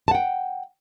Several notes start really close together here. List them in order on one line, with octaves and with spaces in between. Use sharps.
A5 F#5 G5